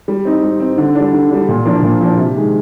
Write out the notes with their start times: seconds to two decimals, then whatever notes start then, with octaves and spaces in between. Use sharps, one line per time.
0.08 G3
0.25 C4 D#4
0.43 G3
0.60 C4 D#4
0.78 D3
0.95 G3 D4
1.13 D3
1.31 G3 D4
1.49 A#2
1.65 F3 A#3 D4
1.82 A#2
2.01 F3 A#3 D4
2.17 C3
2.35 D#3 G#3